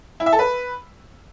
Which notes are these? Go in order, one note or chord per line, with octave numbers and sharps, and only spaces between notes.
E4
E5
A4
B4